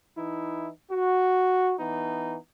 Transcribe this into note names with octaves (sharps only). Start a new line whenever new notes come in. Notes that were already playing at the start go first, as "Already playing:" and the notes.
E3 D#4 E4
F#4
E3 B3 D#4